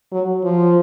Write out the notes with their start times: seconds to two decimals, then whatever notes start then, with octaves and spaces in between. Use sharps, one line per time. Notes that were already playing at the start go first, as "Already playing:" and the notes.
0.12 F#3
0.44 F3